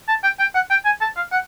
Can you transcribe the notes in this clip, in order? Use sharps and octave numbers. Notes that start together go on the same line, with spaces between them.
A5
G5
G5
F#5
G5
G#5
A5
F5
F#5